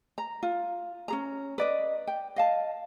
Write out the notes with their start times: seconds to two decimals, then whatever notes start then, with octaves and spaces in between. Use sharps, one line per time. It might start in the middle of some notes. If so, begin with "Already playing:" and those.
0.18 A#5
0.43 F4
1.08 C#4 G#4 A#5
1.58 B4 D5 D#5
2.07 G5
2.36 D#5 F5 A5